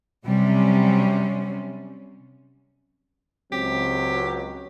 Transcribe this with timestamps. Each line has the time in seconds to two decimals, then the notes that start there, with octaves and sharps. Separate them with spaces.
0.25 C3 F#3 G3 C#4
3.52 C#2 F#3 C4 G4